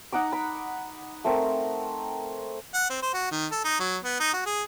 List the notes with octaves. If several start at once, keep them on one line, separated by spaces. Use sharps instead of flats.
D#4 F#5 A#5 D6
B5
A3 C4 A#4
F#5
C4
C5
F#4
D#3
A4
D#4
F#3
B3
D#4
F#4
G#4